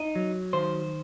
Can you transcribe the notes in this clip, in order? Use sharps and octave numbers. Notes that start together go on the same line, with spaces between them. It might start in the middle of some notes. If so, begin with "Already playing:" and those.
Already playing: D#4
F#3
D#3 C5